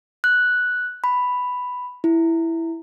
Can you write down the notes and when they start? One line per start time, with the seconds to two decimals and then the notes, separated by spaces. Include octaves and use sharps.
0.24 F#6
1.04 B5
2.04 E4